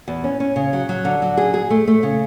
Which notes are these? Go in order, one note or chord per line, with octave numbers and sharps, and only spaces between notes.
E2
C#4
C#4
C#3
F#3
F#3
D3
F#3
G#4
G#4
A3
A3
C#3